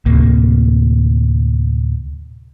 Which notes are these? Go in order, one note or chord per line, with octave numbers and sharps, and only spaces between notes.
D2 A2 C3 A#3